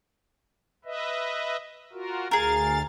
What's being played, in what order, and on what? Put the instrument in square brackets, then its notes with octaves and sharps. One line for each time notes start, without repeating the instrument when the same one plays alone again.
[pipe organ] B4 D#5 E5
F4 F#4 A#4
[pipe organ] D2 F5 A6 [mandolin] G#4 A#4